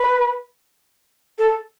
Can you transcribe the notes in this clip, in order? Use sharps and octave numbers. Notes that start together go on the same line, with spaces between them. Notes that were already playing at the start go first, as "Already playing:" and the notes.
Already playing: B4
A4